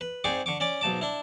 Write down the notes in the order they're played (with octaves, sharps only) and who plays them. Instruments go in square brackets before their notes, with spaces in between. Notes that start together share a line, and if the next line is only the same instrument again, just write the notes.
[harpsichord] B4
G#2 C4 G#4 D5 C#6 D6
D3 C#6 D6
C#4 D5 D6
B1 G#2 A5 D6
D4 E4